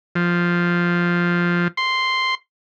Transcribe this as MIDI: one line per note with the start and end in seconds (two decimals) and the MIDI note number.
0.15 1.68 53
1.77 2.35 84